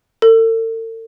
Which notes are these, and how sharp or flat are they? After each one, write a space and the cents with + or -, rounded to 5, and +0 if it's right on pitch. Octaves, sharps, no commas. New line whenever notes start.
A4 +45